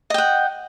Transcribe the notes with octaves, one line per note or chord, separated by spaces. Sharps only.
D#5 F#5 G5